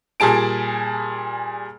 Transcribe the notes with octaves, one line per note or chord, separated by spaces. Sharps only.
A#2 G3 G#4 A5 D7